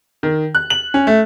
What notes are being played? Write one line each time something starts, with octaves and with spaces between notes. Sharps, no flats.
D#3
F#6
F#7
C#4
A3